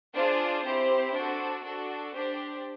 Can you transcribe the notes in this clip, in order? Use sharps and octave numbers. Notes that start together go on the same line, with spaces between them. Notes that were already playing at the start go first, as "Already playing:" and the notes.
D4 F4 G#4 C5
C4 E4 G4
D4 F#4 A4
D4 F#4 A4
D4 G4 C5